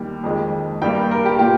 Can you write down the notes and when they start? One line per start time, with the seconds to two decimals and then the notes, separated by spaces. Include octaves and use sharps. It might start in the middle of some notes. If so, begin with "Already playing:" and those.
Already playing: D#2 D#3 G3
0.24 F2 D#3 G#3
0.82 G2 G3 A#3 G5
1.11 A#4
1.26 G4
1.39 A#2 G4